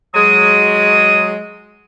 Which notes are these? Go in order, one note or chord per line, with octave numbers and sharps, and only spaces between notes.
F#3 G#3 D#6